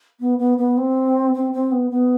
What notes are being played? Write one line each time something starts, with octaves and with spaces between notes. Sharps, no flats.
B3
B3
B3
C4
C4
C4
B3
B3